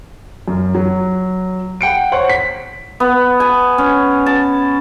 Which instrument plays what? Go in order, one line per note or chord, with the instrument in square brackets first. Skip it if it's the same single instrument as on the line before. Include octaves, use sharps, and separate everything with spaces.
[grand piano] F#2
F#3
F#5 G5 C#7 D7
C5 C#5 F#5 C6
B6
[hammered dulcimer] B3
G#5
C#4
A5